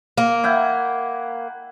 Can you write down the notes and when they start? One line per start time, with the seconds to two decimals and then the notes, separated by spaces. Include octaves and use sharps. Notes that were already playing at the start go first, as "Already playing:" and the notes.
0.18 A#3
0.44 E4 F#5 G5